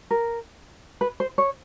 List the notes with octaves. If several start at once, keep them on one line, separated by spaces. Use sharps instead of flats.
A#4
B4
C5
C#5